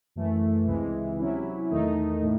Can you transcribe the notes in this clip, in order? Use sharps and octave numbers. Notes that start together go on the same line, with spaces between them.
F#2 E3 A3
C#2 C3 E3 G#3
C3 F#3 C#4 E4
E2 D#3 A3 D#4
A2